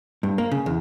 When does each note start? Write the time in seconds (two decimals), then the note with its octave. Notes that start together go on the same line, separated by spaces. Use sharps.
0.23 G2
0.38 A#3
0.51 C#3
0.66 E2